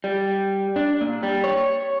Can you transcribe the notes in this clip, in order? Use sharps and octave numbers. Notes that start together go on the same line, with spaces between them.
G3
D4
A#2
G3
C#5